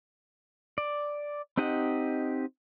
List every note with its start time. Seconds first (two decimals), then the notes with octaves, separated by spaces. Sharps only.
0.78 D5
1.57 C4 D#4 G4 D#5 F#5